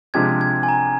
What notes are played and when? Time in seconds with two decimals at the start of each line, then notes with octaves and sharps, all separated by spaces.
0.14 C3 F3 G#3 D4 G4 G#6
0.41 G#6
0.63 G#5
0.69 A#5